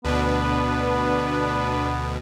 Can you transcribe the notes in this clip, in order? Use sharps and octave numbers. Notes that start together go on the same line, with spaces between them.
D2 B2 B3 D4 B4